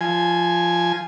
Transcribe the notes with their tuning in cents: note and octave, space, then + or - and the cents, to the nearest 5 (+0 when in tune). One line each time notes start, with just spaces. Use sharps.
F3 -10 G#5 +0